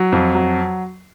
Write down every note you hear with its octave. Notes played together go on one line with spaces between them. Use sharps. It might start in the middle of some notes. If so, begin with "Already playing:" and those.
Already playing: F#3
F2
F#3